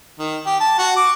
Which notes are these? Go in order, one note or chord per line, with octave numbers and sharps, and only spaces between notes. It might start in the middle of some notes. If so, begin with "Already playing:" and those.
D#3
G4
A5
F#4
D6